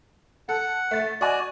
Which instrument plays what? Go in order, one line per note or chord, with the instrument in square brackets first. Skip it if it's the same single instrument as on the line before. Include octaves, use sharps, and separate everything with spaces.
[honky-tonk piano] A4 [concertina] F#5
[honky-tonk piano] A3 A6
[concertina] F#4 D5 [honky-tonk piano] D#5 G#5